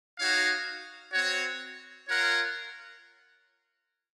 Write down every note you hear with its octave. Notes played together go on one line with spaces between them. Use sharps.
D#4 F#4 C#5 F5
C4 F#4 C#5
F4 A#4 C#5 F#5